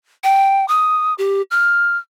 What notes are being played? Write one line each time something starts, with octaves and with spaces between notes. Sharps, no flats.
G5
D#6
G4
F6